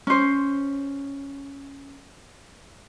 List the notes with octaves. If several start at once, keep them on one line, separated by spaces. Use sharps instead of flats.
C#4 C5